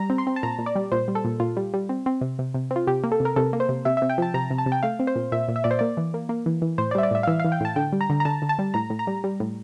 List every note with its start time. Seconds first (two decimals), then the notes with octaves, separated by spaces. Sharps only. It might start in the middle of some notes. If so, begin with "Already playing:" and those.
Already playing: G3 A#5
0.10 C4
0.18 C6
0.27 C4
0.36 A5
0.43 A#2 A#5
0.59 A#2
0.66 D5
0.76 G3
0.92 A#2 C5
1.08 G3
1.15 A4
1.25 A#2
1.40 A#2 F4
1.57 G3
1.74 G3
1.89 C4
2.06 C4
2.21 C3
2.39 C3
2.54 C3
2.71 C4
2.76 F4
2.87 C3 G4
3.04 A#3
3.12 A4
3.20 C3
3.25 A#4
3.36 C3 A4
3.53 A#3
3.60 C5
3.69 C3
3.85 C3 E5
3.97 C3 E5
4.10 G5
4.18 F3 A5
4.34 C3 A#5
4.51 C3
4.58 A5
4.66 C3
4.72 G5
4.83 A3 F5
5.00 C4
5.07 C5
5.16 A#2
5.32 A#2 E5
5.48 A#2
5.56 E5
5.64 A#2 D5
5.71 C5
5.79 A#3 D5
5.97 E3
6.14 A#3
6.29 A#3
6.46 E3
6.62 E3
6.78 A2 C5
6.91 D5
6.95 G3 E5
7.03 D5
7.11 A2 E5
7.23 F5
7.27 E3 E5
7.40 E3 F5
7.52 G5
7.60 A2 A5
7.76 D3 G5
7.93 G3
8.01 A#5
8.10 D3
8.20 A#5
8.25 D3 A5
8.42 D3
8.49 A5
8.59 G3
8.74 A2 A#5
8.90 A2
8.99 A#5
9.07 G3
9.24 G3
9.40 A2